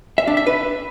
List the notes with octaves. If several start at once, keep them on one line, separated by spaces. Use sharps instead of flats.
E5
D4
E5
B4